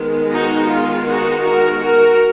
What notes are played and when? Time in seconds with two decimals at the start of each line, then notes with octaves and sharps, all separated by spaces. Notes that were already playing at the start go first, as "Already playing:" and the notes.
Already playing: D#3 G#3 B3
0.31 D#4 F#4
0.69 F4
1.06 D#4 F#4
1.44 F#4 A#4
1.80 F#4 A#4